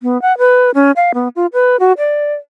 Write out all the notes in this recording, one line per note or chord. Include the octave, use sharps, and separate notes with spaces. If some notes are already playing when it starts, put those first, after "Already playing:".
B3
F#5
B4
C#4
F5
B3
F4
B4
F#4
D5